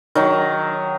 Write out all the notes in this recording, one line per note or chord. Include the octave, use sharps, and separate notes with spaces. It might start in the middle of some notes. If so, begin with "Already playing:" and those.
D#3 F#3 A#5